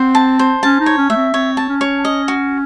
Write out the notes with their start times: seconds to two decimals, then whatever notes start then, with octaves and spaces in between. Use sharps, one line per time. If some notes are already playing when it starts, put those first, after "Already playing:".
Already playing: C4 C5 F#5
0.15 A5
0.39 C5
0.63 C#4 A5
0.80 D#4
0.86 C#5
0.98 C#4
1.10 A3 E5
1.16 C4
1.34 C4 C#5
1.57 A5
1.69 C#4
1.81 C#5
2.05 D#5
2.28 F#4